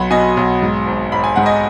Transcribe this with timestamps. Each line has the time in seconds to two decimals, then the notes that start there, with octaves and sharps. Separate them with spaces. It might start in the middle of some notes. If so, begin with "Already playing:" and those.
Already playing: B1 F#3 F#5 B5
0.11 B2 D#5 G#5
0.37 B1
0.62 G#2
0.86 G#1
1.12 G#1 B5
1.24 G#5
1.36 G#2 F#5
1.46 D#5 G#5